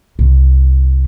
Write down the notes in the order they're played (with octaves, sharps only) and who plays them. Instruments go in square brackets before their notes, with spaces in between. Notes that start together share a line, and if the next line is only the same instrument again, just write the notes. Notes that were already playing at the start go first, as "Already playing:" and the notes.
[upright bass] C2